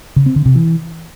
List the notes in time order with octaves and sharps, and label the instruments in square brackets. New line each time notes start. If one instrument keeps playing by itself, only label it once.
[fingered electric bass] C#3
C4
D3
C3
E3